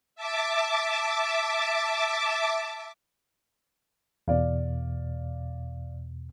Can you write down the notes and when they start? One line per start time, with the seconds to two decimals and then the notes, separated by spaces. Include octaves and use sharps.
0.16 E5 A5 D6
4.28 E2 B2 D5 F5